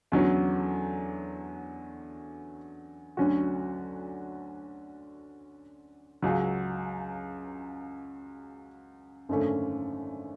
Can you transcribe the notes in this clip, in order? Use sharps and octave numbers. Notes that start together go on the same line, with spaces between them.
E2 D3 F#3 C#4
D2 D3 F#3 C#4 F#4
C#2 C#3 F#3
G#1 F#2 D3 A3 C#4